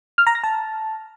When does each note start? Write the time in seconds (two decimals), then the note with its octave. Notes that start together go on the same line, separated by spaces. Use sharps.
0.18 F6
0.27 A#5
0.35 A#6
0.43 A5